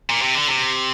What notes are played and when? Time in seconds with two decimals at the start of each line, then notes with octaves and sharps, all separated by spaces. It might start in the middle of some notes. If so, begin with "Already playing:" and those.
0.10 A#2
0.22 C3
0.35 D3
0.48 C3